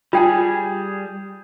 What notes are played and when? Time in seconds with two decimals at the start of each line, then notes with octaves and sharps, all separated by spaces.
0.13 G3 F4 G#4 G5 A5